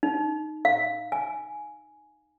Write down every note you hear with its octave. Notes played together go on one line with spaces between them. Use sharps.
D#4
F5
G#5